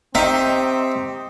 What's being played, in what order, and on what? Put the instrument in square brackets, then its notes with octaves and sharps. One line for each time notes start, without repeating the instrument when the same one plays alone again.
[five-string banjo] D#3 [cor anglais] C4 [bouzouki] D#4 G4 [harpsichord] E5